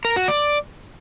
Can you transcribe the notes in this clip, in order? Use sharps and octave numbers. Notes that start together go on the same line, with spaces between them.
A#4
F#4
D5